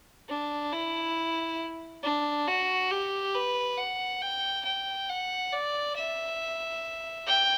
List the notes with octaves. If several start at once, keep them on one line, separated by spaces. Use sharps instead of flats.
D4
E4
D4
F#4
G4
B4
F#5
G5
G5
F#5
D5
E5
G5